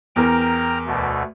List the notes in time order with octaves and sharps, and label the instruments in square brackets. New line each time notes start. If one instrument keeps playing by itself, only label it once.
[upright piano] E2 A#4 [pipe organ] G5 A#5 F6
[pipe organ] D2 B2 A3